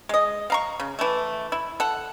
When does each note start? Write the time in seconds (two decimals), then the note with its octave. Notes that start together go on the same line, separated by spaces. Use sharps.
0.09 G#3 D#5
0.50 F5 A#5 C#6
0.80 C#3
0.99 E3 A3
1.52 E4
1.80 A4 F#5